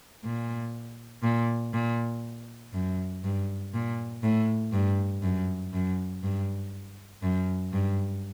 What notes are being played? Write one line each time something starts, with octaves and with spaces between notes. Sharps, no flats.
A#2
A#2
A#2
F#2
G2
A#2
A2
G2
F#2
F#2
G2
F#2
G2